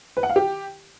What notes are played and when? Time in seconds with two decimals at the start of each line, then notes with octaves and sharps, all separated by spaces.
0.17 B4
0.23 F#5
0.29 F5
0.36 G4